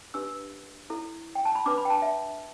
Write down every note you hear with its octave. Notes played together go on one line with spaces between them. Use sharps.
D4 G4 B4 E6
E4 A4
G5
A5
B5
D4 B4 D6
B5
G5
A5
E5